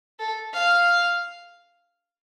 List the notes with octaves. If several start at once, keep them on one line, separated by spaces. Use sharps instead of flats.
A4
F5